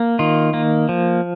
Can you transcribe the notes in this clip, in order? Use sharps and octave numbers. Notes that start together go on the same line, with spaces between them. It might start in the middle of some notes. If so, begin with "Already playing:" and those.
Already playing: A#3
D#3 F4
A#3
F3